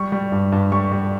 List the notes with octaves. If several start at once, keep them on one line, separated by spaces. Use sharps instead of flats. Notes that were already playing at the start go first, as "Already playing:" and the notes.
Already playing: G3 C#6
G3
G2
G2
G3 C#6
G3